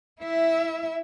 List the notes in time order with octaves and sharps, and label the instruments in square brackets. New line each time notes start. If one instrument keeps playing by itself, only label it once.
[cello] E4 E5